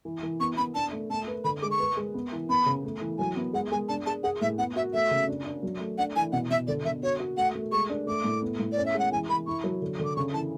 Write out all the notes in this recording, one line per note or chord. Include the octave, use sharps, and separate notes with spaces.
E3
E3
B3 C#6
B3 B5
D4 A5
A3
A3 A5
B4
D3 B5
G#3 D6
C#6
B4
G#3
B3
E3
B3 B5
C#3
A3
E3
F#3 G#5
B3
G#3 F#5
G#3 G#5
D4 A5
G#4 A5
G#4 F#5
A2 E5
B3 F#5
F#4 E5
A3 E5
C#3
D4
D4
F#3
A3
D4 F#5
E3 G#5
B2 F#5
B2 E5
D3 D5
D3 E5
F#4 C#5
F#4
A3 F#5
A3
G#3 C#6
D4
A3 D6
A2
B3
A2
D5
C#4
E5
G#3 F#5
E3 G#5
E3 B5
E4 C#6
F#3
D3
D3
D6
C#3 C#6
E3 A5